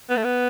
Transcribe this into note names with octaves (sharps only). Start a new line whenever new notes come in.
B3
A3
B3